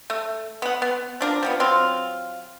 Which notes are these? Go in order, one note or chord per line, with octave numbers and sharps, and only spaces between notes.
A3
B3 F#5
B3
F3 D4 A#4
F3 G3 B3
F#3 C4 F4